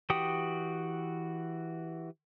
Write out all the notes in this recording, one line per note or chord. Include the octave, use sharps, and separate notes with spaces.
E3 F#4 G4 G5 D#6